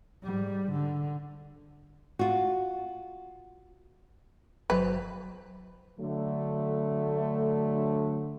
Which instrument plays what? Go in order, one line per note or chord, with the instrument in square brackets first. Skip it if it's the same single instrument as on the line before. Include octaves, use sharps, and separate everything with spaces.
[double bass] G#2 G3
D3
[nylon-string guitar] F4 F#4
[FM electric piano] G1 F#3 C5 [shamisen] B4
[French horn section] D3 F#3 A3